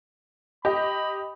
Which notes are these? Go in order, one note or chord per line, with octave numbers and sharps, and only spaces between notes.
G4 D#5 B5